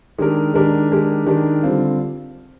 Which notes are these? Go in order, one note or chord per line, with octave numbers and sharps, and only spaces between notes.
D#3 G#3 D4 G4 A#4
D#3 G#3 D4 G4 A#4
D#3 G#3 D4 G4 A#4
D#3 G#3 D4 G4 A#4
D3 G3 C4 F4